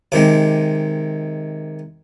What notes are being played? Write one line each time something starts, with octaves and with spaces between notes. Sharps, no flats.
C3 D#3 G#3 C4 D6